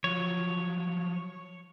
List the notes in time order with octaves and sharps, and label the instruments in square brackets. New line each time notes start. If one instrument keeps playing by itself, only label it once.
[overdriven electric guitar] F3 F#3 [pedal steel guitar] C#5